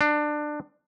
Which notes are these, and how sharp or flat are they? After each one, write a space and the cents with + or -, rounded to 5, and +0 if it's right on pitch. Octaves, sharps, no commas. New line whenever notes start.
D4 +20